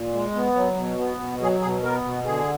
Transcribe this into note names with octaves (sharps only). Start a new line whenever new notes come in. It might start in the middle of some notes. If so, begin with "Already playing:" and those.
Already playing: A#2
G#3
B3
F#3
B2
B3
B2
F#3 G#4
B2 G#4
B3 A#4
B2
D3 G#4